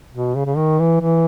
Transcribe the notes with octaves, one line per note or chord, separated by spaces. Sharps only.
B2
C#3
C#3
D#3
E3
E3